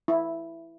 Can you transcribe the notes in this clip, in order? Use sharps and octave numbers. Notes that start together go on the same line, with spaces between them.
E4